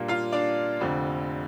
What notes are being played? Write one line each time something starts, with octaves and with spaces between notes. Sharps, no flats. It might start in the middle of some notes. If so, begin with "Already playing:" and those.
Already playing: A#2 G3 A#3 D4
F4 F5
D4 D5
F1 F2 D3